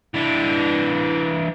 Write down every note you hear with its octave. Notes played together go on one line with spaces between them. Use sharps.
E3 D4